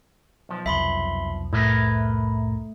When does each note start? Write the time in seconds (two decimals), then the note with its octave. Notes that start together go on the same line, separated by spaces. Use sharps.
0.49 B1 F3
0.66 C2 F2 E5 B5 C6
1.53 A2 A3 E4 A#4 B4